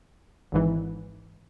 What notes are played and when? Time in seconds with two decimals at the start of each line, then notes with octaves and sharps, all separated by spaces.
0.52 G#1 G#2 E3